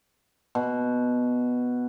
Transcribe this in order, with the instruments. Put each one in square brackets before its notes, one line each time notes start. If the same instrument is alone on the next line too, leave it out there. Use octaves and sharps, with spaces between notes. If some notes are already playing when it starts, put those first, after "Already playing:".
[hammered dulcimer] B2